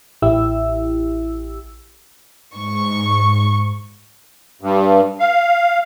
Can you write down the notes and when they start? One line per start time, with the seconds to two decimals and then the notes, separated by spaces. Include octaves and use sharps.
0.22 A1 E4 G4 E6
2.53 G#2 C#6
4.61 G2
5.20 F5